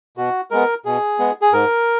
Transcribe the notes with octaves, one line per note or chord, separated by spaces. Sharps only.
B2 F#4
G#3 B3 A#4
B2 G#4
G#3 B3
G#4
G#2 A#4